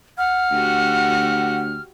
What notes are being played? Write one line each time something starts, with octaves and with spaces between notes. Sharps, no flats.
F#5 F6
D2 F#4 G4